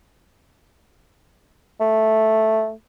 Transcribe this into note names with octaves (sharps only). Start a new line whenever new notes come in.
A3